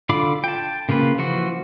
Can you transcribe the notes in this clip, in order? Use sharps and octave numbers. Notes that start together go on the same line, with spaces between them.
D3 F4 F5 B5 D6
G5 A5
C#3 A#3 F4 B4
E3 F3 F#4